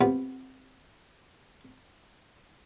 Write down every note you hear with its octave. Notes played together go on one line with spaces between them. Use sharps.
C3 F3 B3